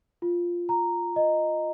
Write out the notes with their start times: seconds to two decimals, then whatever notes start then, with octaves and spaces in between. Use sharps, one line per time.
0.22 F4
0.69 A#5
1.16 D#5